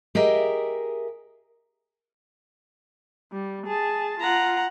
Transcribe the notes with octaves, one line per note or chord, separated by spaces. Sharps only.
G4 G#4 A#4 D#5 E5
G3
G#4 A5
F4 F#5 A#5